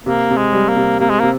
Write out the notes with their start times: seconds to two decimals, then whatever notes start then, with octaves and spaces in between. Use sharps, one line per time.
0.06 C3 A#3
0.30 C3
0.37 G#3
0.53 G3
0.68 A#3
0.76 C3
1.00 C3 A#3
1.10 G#3
1.20 C3 A#3